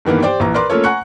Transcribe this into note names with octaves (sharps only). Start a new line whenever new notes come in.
G2 D#3 E3 A#3 B3
G4 C5 D5 G5 D6
A#1 E3 A#5
A#4 B4 D5 A#5 C6 D6
A3 A#3 C#4 F4 A4 C#5
F#5 G#5 A#5 C#6 F#6 C#7